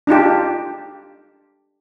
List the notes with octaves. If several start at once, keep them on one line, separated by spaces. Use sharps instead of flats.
D4 D#4 F4 G4